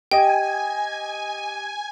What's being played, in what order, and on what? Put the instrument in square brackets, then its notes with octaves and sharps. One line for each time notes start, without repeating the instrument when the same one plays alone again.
[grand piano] G4 D#5 [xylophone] G5 [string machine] G#5